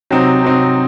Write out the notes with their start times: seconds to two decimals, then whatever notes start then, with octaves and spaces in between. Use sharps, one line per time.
0.11 C3 F#3 C4 D#4
0.43 C3 F#3 C4 D#4